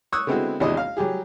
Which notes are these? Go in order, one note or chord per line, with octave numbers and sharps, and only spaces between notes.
C#6 D#6 E6 F#6
D3 G#3 B3 C4 E4 F#4
G#1 E2 C3 D4 E4 D#5
F5
F#3 G3 G4 G#4